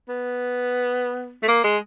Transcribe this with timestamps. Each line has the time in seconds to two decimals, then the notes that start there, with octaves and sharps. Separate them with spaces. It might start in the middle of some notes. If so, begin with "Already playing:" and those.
0.09 B3
1.43 A3
1.48 A#3
1.64 G#3